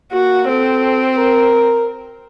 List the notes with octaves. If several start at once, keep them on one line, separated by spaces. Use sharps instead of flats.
A#3 F#4
C4 A4
A#4